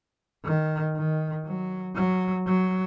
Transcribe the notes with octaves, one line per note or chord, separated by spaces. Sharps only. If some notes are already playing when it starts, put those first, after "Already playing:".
D#3
D#3
F#3
F#3
F#3